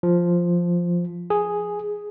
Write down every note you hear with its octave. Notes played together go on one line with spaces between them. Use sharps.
F3
G#4